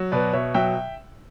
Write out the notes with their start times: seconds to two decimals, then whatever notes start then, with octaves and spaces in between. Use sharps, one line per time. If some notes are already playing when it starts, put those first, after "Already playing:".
Already playing: F#3
0.12 B2 B4 D5
0.33 B2 C#5 E5
0.54 F#3 E5 G5